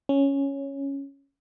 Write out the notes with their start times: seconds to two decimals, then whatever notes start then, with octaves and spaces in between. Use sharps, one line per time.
0.09 C#4